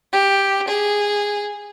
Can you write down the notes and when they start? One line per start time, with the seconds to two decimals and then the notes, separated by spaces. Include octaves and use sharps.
0.13 G4
0.68 G#4